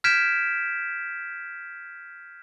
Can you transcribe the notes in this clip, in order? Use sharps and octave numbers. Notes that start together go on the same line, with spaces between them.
F6 G6 G#6 B6 D7 E7